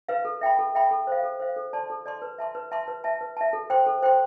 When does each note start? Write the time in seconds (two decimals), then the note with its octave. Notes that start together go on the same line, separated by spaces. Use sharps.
0.09 B4 F5
0.25 A4
0.41 E5 G5 B5
0.59 A4
0.75 E5 G5 B5
0.91 A4
1.07 C5 F5
1.23 A4
1.40 C5 F5
1.56 A4
1.73 D5 A5 C6
1.90 A4
2.06 D5 A5 C6
2.22 B4
2.38 E5 A5 C6
2.55 B4
2.71 E5 A5 C6
2.88 B4
3.04 E5 A5
3.21 B4
3.37 E5 A5
3.53 A4
3.70 C5 G5 C6
3.86 A4
4.03 C5 G5 C6